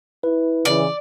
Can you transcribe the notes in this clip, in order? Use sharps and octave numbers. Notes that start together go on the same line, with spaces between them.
E4 B4
C#3 E3 D5